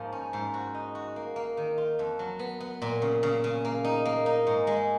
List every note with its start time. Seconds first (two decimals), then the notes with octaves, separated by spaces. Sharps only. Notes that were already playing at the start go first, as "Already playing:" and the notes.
Already playing: G#2 F3 A#3
0.13 C#4
0.33 G#2
0.54 F#4
0.74 D#4
0.95 F#4
1.16 A#3
1.36 A#3
1.57 D#3
1.78 F4
1.99 F2
2.19 F#3
2.39 B3
2.60 B3
2.82 A#2
3.02 C#3
3.23 C#3
3.44 C#3
3.65 A#3
3.85 D#4
4.05 A#3
4.26 D#4
4.47 G#2
4.67 G#3